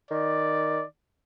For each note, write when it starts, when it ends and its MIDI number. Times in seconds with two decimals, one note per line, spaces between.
0.11 0.81 51
0.11 0.86 74